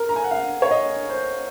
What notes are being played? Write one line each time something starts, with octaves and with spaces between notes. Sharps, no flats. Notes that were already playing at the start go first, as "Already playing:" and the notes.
Already playing: A#4
A#5
G#5
F#5
F5
C#5
D#5
C5